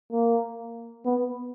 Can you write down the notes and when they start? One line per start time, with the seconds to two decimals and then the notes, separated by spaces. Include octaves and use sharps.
0.12 A#3
1.05 B3